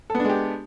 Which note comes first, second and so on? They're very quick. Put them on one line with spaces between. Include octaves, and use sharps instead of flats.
A4 B3 D4 G#3 G4